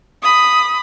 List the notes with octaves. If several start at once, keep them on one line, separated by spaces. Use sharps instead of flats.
B5 D#6